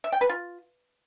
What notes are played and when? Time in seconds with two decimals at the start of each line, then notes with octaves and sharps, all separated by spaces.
0.04 E5
0.13 G5
0.21 B4
0.29 F4